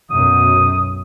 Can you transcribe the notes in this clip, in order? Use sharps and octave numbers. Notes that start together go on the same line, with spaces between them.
B1 F#2 D#6